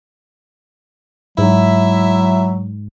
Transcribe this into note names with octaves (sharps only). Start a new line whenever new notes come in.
G#2 F#3 E4 E5